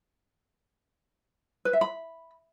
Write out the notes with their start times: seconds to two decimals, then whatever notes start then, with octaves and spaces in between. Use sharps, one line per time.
1.65 B4
1.73 E5
1.81 B5